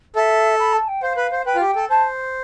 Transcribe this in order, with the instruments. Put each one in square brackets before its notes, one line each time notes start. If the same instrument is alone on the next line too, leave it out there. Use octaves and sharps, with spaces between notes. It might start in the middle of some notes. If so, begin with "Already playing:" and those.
[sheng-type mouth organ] A4 [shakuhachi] E5
[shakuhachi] B5
A5
G5
[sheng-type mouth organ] C5 [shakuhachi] F5
[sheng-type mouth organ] B4
C5
[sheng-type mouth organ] B4 [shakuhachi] G5
[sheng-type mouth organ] F4
G4
A4
[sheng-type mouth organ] C5 [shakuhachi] A5